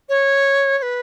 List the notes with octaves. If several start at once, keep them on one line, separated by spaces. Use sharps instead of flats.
C#5
C#5
B4